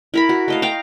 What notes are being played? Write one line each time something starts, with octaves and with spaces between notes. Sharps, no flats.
E4 A#4 B5
F#4
A3 D#5 F5
F5 G5 A#5